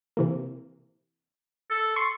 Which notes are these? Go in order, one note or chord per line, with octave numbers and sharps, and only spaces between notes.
C3 E3 A#3
A4
C6 C#6